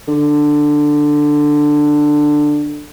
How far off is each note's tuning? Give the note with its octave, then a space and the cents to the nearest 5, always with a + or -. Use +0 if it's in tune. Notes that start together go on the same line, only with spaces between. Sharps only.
D3 +10